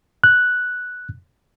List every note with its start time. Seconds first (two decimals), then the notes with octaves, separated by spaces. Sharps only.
0.24 F#6